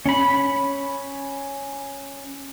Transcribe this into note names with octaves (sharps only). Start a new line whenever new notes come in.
C#4 B5